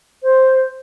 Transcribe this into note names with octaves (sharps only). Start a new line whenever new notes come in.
C5